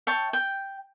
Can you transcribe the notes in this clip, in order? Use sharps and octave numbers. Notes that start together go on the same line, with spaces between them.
C#5 E5 G5 A5
G5